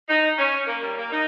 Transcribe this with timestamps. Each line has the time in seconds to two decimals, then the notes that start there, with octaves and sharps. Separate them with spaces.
0.08 D#4
0.38 C#4
0.67 A#3
0.82 G3
0.97 A#3
1.11 D#4